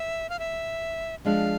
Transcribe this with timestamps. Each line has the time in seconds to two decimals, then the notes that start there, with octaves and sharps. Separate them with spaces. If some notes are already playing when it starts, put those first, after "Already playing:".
Already playing: E5
0.29 F5
0.39 E5
1.25 F3 G#3 D4 F5